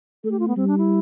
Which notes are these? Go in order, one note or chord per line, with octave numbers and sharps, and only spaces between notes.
A3 A4
G4
F4
B3
G3 C4
D4
E4